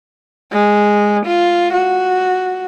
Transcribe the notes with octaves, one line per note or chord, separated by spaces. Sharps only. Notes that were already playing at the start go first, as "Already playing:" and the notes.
G#3
F4
F#4